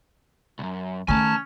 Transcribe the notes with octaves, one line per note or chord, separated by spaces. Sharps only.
C2 F#2
D#3 A3 C#4 G#5 A5